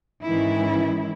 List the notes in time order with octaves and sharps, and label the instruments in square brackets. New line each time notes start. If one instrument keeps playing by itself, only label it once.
[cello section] G#2 D#3 E3 G#3 C#4 E4